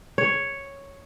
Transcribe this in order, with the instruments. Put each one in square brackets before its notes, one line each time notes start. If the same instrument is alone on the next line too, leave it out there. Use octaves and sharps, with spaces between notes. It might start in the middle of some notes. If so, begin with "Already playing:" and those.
[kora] C#5